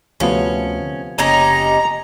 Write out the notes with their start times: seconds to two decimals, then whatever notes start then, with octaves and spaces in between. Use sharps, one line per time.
0.20 D2 C3 F3 B3 C#4
1.18 F#1 C#4 D#4 G4 A#5